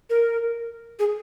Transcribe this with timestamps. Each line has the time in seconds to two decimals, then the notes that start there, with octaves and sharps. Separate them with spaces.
0.10 A#4
0.99 G#4